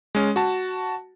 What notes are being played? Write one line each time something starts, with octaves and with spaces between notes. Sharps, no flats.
G#3 C#4
F#4 A5